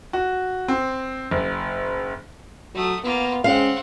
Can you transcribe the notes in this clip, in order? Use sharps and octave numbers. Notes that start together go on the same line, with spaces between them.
F#4
C4
F#1
F#3 A3 D#6
A#3 B3 F4
G#3 C4 C#4 F5 F#5